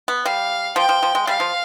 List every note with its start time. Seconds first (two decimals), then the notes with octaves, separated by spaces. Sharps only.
0.08 B3
0.25 G3 F5
0.76 F3 G5
0.89 F3
1.03 F3
1.15 G#3
1.27 G3 F5
1.40 F3